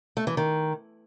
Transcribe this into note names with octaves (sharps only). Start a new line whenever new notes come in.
A3
E3
D#3